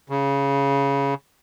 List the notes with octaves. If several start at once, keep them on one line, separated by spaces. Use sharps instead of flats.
C#3